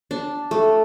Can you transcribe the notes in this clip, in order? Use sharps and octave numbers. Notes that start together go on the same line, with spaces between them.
D4
A3